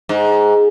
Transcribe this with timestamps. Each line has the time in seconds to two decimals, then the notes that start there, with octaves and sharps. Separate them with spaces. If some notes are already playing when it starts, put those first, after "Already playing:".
0.09 G#2